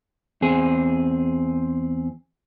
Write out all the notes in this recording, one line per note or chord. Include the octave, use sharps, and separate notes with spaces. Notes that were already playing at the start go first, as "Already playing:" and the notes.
E2 C4 G#4